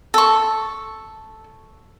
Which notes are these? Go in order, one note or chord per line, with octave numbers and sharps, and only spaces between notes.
A4 C#6